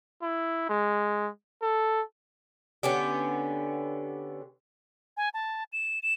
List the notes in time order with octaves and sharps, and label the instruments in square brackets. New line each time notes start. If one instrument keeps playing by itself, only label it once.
[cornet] E4
G#3
A4
[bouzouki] D3 B3 C#4 G4
[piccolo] G#5
A5
E7
E7